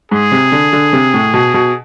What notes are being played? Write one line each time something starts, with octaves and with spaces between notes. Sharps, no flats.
G#2 G#4
C3
D3
D3
C3
A2
B2
B2